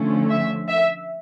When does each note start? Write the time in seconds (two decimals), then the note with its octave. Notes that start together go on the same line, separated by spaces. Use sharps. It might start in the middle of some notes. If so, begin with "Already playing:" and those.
Already playing: D3 F3 A3 C#4
0.30 E5
0.69 E5